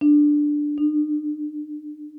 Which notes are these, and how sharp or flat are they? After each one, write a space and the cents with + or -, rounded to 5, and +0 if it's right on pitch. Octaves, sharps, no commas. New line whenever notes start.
D4 +5
D4 +45